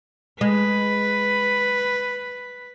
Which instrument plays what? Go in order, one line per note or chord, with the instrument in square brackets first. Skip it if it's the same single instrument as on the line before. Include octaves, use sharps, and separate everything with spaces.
[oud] G#3 [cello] B4